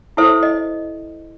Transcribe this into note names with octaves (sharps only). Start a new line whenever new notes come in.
E4 A4 C5 E5
D#5